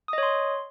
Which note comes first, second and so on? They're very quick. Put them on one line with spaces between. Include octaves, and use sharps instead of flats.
D#6 D#5 C#5 C6